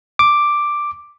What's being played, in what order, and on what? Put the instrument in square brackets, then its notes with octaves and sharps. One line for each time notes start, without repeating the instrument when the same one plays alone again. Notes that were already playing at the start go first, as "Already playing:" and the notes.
[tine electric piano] D6